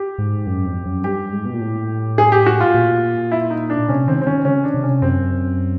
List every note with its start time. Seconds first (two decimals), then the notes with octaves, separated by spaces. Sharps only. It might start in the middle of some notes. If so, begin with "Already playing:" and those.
Already playing: G4
0.18 G#2
0.47 F#2
0.65 F2
0.86 F#2
1.04 G2 G4
1.33 G#2
1.45 B2
1.53 A#2
1.61 A2
2.18 G#4
2.32 G4
2.46 F#4
2.61 F4
2.74 A#2
3.32 E4
3.50 D#4
3.70 D4
3.89 C3 C#4
4.08 D#3 C4
4.22 C4
4.26 D#3 C#4
4.45 C#3 C#4
4.64 D4
4.74 C3
4.83 C#4
5.02 F#2 C4